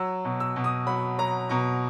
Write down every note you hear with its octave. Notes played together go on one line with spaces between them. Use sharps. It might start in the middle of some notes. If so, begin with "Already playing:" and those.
Already playing: F#3 E6
B2
E6
B2
D#6
F#3 B5
F#3 A#5
B2 A#5